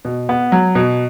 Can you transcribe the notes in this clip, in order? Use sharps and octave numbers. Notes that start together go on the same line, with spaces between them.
B2
B3
F#3
B2